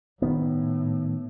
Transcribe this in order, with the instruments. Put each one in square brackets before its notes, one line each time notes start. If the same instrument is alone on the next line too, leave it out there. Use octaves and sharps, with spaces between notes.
[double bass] A2 [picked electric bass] D#3 B3